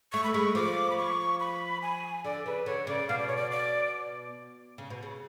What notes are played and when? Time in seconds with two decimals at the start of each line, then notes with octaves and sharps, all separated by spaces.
0.13 A3 C#6
0.24 B5
0.34 G#3 C#6
0.55 F3 D6
0.90 B5
0.97 C#6
1.40 B5
1.82 G#5
2.24 D3 D5
2.45 C#3 B4
2.66 D3 C#5
2.87 C#3 D5
3.08 B2 F5
3.18 D5
3.27 C#5
3.36 D5
3.51 D5
4.78 C#3
4.90 B2
5.03 C#3